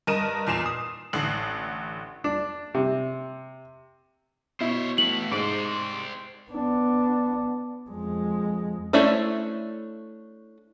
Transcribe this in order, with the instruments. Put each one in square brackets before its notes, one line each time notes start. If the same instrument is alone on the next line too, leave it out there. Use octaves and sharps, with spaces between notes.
[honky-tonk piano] G2 A#4 D#5 D#7 E7
E2 A#2 C7 E7 F7
D#6
A1 D3 C7 F#7
[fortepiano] D4
C3
[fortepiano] B2 E4 [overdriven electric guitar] C5 C#5
[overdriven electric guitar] A3 B4 [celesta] F#7
[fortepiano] G#2 [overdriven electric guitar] C5 D5
[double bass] B3 D4
F2 G#3
[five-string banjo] A3 C#4 D4 E4 C5